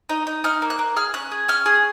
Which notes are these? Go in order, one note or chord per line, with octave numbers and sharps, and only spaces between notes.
D#4
D#4
D#4 F6
A#3
F#6
A#3
G#4 F6
C#4 F#6
G#4
C#4 F6
G#4